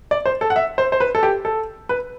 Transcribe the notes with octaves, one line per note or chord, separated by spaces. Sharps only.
D5
C5
A4
F#5
E5
C5
C5
B4
A4
G4
A4
B4